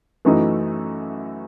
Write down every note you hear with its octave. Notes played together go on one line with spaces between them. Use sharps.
F#2 E3 A3 D#4 F#4